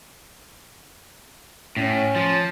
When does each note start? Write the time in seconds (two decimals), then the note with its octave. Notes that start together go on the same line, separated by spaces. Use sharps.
1.77 A2 C#4
2.16 F3